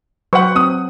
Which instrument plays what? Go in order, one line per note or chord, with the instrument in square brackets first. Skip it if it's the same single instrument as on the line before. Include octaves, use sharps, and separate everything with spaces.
[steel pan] F#3 B4 C5 [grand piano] F#5 C#6
[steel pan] C4 [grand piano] D#6